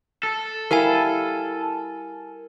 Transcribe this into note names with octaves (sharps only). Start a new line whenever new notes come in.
A4
G3 E4 A#4 F5 G#5